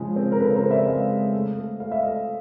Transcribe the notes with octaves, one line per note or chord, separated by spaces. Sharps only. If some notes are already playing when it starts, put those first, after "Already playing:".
Already playing: C#3 F3 G#3
C4
A#4
C#3 A4 B4
A#4 C5
C4
D5 E5
G#3 D#5 F5
G#3
A3
A3
A3 F5
E5
A3 D#5 F5